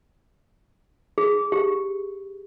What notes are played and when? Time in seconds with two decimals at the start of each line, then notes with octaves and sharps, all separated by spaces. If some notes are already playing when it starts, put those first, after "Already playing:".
1.18 G#4
1.52 G4